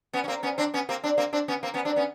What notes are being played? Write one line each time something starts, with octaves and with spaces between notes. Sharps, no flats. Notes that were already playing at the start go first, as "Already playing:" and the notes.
B3 C#4
C#4
A#3 C4
B3 C#4
C4 D4
B3 C#4
A#3 C4
C4 D4
A#3 C4
C4 D4
B3 C#4
A#3 C4
B3 C#4
C4 D4
B3 C#4